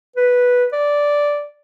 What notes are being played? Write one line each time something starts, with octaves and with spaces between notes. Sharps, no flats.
B4
D5